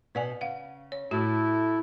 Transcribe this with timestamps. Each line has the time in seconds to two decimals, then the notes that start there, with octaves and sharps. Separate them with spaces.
0.15 B2 B4 D5 F#5 G#5
0.41 C#3 F5 F#5
0.92 C#5
1.11 A2 A3 E4 F#4